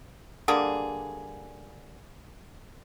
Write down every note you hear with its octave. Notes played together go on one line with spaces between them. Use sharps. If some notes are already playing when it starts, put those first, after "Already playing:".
D3 G3 A#3 G#4